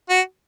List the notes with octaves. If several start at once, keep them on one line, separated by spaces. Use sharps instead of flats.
F#4